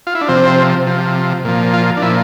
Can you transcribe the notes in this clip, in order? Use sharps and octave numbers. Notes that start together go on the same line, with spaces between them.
F4
E4
D4
C3 F3 C4
C3 F3
A#2 F3
F4
D4
A#2 F3 E4